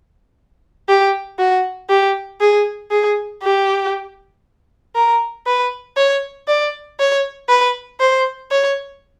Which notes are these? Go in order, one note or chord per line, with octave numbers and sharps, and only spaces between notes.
G4
F#4
G4
G#4
G#4
G4
A#4
B4
C#5
D5
C#5
B4
C5
C#5